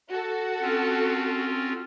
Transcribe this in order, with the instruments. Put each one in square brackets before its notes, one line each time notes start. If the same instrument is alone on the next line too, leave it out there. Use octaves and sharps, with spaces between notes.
[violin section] F#4 A4
[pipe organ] C4 C#4 F4